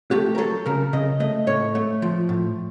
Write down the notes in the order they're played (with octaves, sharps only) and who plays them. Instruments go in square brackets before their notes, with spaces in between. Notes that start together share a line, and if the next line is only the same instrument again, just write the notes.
[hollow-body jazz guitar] A3 G4
A#4
F#3 A4
C#3 A#4
C#3 D#5
A3 D#5
A2 C#5
A3
F3
A2